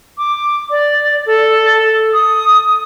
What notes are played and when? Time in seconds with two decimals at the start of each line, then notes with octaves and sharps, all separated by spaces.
0.18 D6
0.71 D5
1.26 A4
2.14 D#6